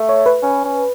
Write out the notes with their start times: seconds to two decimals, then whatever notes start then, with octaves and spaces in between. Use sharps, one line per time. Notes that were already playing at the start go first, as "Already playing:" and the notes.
Already playing: A3
0.09 C#5
0.26 B4
0.43 C#4
0.65 C#4